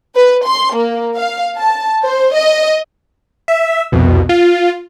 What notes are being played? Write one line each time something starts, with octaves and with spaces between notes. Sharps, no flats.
B4
C6
A#3
F5
A5
C5
D#5
E5
C2 F2 B2
F4